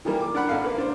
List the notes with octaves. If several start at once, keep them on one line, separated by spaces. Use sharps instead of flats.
D#3 E3 G3 A#3
D6
D4 A#4 F#5 B5
G#1 A4 F5
A#3 B4
D4 C5